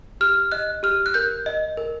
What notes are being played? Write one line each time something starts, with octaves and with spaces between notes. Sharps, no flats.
G4 F6
D#5 F#6
G4 F6
F#6
A#4 G6
D#5
A#4